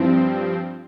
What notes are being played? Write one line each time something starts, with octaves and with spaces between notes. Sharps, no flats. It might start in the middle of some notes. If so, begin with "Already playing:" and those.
Already playing: G2 F3 C4 E4